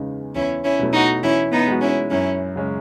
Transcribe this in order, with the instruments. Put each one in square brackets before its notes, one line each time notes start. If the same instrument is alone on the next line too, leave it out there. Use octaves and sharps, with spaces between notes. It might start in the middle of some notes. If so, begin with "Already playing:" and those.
Already playing: [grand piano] E2 C#3 G#3 D#4
[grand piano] E2 [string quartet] C#4 E4
[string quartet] C#4 E4
[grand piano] B2 F#3 A3 E4
[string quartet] D#4 F#4
[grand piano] E3 [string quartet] C#4 E4
[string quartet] B3 D#4
[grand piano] G#3 D#4 F#4
[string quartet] C#4 E4
[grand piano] F#2 [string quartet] C#4 E4
[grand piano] C#3 G#3 C#4